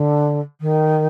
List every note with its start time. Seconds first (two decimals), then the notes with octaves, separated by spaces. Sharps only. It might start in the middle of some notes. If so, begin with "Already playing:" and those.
Already playing: D3
0.61 D#3